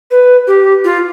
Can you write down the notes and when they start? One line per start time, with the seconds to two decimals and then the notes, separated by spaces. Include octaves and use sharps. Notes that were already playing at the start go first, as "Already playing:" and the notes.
0.11 B4
0.47 G4
0.85 F4